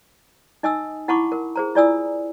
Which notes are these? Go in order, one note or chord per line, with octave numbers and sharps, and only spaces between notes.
D#4 D#5 G#5 D#6 E6
E4 F#5 A5 B5 C#6 D6
A#4
G#4 C5 A#5
E4 F4 D5 G#5 D#6 E6